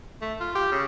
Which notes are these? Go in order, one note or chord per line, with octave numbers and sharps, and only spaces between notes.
A3
F4
G4
C#3